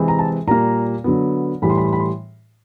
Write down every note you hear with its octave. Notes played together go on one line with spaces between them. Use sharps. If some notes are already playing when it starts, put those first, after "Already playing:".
Already playing: C3 E3 G#3 C4
A#5
A5
A#2 G3 A#3 A#5
D3 F#3 B3
A2 E3 G3 B5
C6
B5
C6
B5
C6